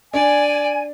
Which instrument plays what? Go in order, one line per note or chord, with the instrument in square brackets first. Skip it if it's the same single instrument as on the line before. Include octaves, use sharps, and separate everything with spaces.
[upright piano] D4 [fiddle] D5 [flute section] G#5